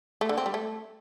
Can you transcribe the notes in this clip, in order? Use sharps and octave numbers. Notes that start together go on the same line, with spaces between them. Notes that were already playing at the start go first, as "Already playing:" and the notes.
A3
D3
C4
G3
A3